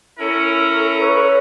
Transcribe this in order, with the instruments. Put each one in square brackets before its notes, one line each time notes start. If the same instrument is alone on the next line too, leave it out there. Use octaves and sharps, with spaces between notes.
[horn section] C#4 E4 A#4 [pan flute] A4
[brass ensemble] B4 C#5